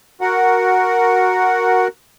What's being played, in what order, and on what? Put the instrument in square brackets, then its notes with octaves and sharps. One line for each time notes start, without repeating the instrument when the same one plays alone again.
[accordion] F#4 A#4 F#5